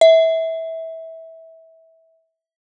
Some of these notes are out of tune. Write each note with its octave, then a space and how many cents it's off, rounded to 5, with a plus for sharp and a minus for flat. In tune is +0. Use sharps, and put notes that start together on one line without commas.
E5 -20